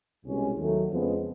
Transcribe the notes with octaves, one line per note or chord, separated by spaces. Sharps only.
C2 B2 G#3 C#4
D#2 D#3 F#3 A3
F2 C#3 F3 G#3 B3